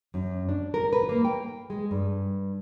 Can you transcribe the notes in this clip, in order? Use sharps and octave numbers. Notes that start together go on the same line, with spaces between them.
F#2
D4
A#4
B4
A#3
G5
G#3
G2